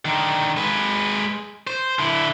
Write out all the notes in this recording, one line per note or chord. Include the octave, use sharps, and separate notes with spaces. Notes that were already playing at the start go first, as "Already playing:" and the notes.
D3 D#3
G#3 B4
C5
D3 E4